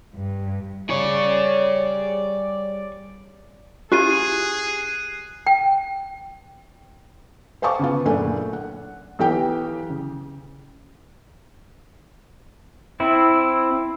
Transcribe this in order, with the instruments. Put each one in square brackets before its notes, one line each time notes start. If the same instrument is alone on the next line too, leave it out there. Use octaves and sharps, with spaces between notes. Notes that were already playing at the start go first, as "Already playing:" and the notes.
[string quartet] G2
[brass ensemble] G3 D5 [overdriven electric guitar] G#4 C#5
[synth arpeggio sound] C#4 E4 F4 [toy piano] G4 [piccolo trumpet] G#4 [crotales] F#6 C7 D#7
[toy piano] G5
[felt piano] C5 F5 G#5 A5 C#6 D6
C#3 B3 F4
F#1 A#2 A3 D4 G#5
F#5
B1 E3 G4 G5
C#3
[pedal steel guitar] C4 E4